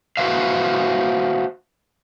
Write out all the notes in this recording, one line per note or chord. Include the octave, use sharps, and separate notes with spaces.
F#4 B4 C5 E5 F5